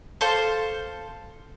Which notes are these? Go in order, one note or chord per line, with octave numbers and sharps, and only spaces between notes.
A4 C5 F5